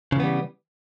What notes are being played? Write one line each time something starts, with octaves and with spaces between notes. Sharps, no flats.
C#3 E3 G3 B3